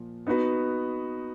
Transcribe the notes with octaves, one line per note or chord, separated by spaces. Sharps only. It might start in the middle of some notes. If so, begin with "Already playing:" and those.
Already playing: A#2 F3
B3 D#4 F#4 B4